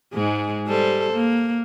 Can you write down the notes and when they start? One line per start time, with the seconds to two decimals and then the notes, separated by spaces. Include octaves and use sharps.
0.13 G#2 G#3
0.68 G3 A4 C5
1.13 A#3